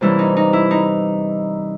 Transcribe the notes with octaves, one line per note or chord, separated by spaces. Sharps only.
C3 E3 G3 A#3 C#4 E4
D#4
D#4
E4
D#4